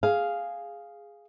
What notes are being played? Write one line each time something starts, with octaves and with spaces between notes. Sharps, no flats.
G#4 F5